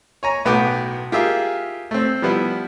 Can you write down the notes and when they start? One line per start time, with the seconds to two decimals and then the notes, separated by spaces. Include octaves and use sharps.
0.23 C#5 G#5 A#5
0.45 B1 A2 B3 F#4 G5 D6
1.12 F4 G4 G#4 A#4 E5
1.91 A3 C4
2.22 F3 G3 B3 E4